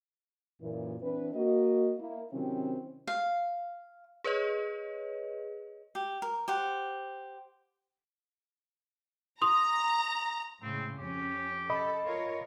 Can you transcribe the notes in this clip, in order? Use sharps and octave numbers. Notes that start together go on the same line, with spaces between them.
F#2 A#2 E3
E3 C4 D4 B4
A#3 F#4 D#5
A#3 E4
C3 D#3 F#3 C4 C#4 E4
F5
G#4 B4 C#5 D#5
G4
A#4
G4 C5 F#5
A#5 C6 D#6 F7
A2 C#3 G#3 C4
F2 C#4 G4
A4 D#5 B5
F4 A#4 C#5